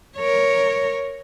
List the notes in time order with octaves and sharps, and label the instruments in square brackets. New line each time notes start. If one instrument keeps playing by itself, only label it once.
[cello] A#4 C#5